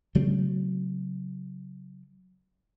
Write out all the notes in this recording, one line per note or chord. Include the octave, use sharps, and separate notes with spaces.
C#3 F#3 A3 C4